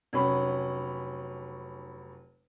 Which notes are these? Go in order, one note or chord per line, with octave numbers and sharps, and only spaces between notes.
F1 F#3 C#4 B5